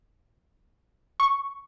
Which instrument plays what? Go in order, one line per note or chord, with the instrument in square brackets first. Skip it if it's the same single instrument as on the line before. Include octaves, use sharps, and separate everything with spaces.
[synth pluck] C#6